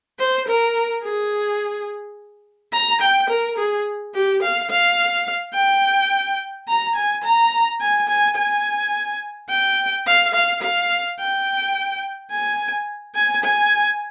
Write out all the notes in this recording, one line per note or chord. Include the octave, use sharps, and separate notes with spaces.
C5
A#4
G#4
A#5
G5
A#4
G#4
G4
F5
F5
G5
A#5
G#5
A#5
G#5
G#5
G#5
G5
F5
F5
F5
G5
G#5
G#5
G#5